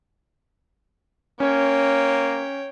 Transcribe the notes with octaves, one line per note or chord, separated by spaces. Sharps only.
A#3 C#4 C#5 G5